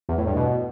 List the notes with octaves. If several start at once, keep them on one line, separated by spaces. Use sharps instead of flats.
E2
A2
G2
B2